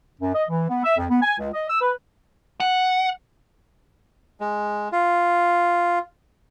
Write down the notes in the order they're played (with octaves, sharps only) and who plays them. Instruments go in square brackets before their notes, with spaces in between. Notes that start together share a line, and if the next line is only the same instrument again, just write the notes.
[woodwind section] F#2
D#5
E3
B3
E5
F2
B3
G#5
C#2
D#5
E6
B4
[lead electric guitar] F#5
[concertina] G#3
F4